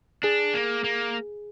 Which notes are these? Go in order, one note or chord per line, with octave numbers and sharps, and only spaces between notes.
D4 G#4
A#3
A#3